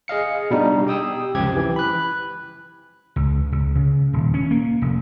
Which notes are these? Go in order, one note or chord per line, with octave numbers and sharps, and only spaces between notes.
G#4 D#5 F5 C#7
B2 G3 D4 D#4 F#4
G4 G5 D#6 E6
C#2 F#2 C3 F3 G4 G#6
E3
B5 F#6
C#2
C#2
C#3
D#1
C#4
A#3
F1